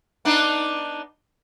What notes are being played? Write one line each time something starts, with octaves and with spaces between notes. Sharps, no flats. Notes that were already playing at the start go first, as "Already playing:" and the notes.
B3 D4 D#4